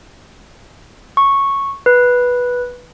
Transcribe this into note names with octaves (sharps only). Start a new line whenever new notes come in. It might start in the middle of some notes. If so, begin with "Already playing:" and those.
C#6
B4